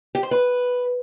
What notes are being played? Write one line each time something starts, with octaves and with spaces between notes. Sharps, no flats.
G4
C5
B4